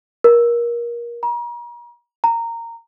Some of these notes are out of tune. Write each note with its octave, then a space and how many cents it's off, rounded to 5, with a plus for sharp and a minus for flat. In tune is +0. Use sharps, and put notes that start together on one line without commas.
A#4 +25
A#5 +40
A#5 -15